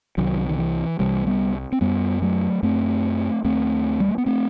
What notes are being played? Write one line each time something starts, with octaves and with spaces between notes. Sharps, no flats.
C2 C3 D#3 F#3
D#3
E3
C2 C3 E3 G3
G3 B3
C4
F#2 G3 B3
F#3 A3
F#2 A3 C4
D#2 A3 C4
G3
A3
B3
A3 C4